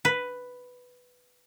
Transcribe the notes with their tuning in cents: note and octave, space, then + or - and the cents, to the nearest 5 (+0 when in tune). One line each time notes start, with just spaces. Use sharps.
B4 +5